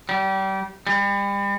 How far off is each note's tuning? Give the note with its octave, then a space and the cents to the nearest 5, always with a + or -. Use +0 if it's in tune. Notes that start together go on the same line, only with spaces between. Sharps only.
G3 -30
G3 +35